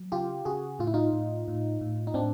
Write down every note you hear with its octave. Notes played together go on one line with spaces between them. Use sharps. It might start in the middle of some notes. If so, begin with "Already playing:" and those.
Already playing: F#3
C#3 F4 G4
C#3 F#4 G#4
A2 F4
E4
D#4 F4
A2
A2
A2
D#4
A2 C4 D4